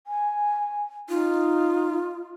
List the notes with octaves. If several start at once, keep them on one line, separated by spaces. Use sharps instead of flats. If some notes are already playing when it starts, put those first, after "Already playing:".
G#5
D#4 F4